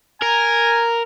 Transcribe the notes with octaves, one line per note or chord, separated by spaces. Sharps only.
A#4 G#5